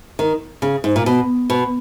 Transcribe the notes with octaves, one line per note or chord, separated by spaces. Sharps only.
D#3
C#3
G#2
A#2
B2
B2